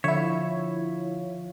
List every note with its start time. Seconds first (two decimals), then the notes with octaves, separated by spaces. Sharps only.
0.04 D3 F3 E4 C#5 E5